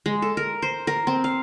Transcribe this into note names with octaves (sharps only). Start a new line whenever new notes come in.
G#3
A4
A#4
C5
A#4
C4
F5